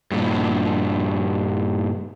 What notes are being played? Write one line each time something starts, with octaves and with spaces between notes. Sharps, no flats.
G2 A#2